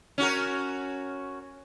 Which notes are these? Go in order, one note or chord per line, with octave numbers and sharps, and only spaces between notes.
C#4 F#4 A#4